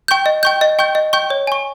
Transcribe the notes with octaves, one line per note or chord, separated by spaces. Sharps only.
G5 C#6 G6
D#5
G5 C#6 G6
D#5
G5 C#6 G6
D#5
G5 C#6 G6
C#5
G#5 C#6